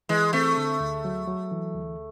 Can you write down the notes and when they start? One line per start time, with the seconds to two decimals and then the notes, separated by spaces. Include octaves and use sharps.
0.09 E3 G#3
0.33 A3 C4
0.57 D3
0.80 D2
1.05 F#3
1.27 F#3
1.51 E3
1.75 D2